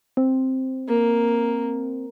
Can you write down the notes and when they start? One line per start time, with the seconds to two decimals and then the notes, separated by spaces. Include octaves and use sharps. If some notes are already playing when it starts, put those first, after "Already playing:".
0.17 C4
0.88 A#3